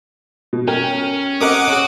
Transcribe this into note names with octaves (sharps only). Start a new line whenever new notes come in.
B2
C#4 A#4 G5
C4 A#4 D#5 F#5 D6 D#6
C#4 F#4 G#4